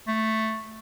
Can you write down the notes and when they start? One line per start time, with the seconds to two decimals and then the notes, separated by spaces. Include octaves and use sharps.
0.07 A3